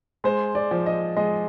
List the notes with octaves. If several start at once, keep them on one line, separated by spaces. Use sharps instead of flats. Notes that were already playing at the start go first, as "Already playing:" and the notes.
G#3 C5
D5
F3
D#5
G#3 D#5